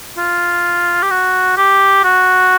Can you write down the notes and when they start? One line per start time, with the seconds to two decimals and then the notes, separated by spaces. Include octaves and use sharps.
0.17 F4
1.02 G4
1.11 F#4
1.57 G4
2.04 F#4